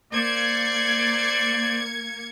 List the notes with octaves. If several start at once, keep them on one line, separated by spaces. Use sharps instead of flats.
A#3 C5 D5 G#6 C#7